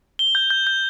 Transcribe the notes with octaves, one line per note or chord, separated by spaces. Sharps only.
G7
G6
G6
G6